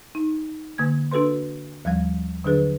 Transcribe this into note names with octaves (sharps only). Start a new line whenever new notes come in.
D#4
D3 A#3 G#6
D4 F#4 A4 B4 C6
D#2 F3 G3 F5
D3 F#3 D4 G#4 B4